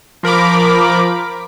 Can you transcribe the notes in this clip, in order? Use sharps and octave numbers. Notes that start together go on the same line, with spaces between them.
F3 A#4 B5 D6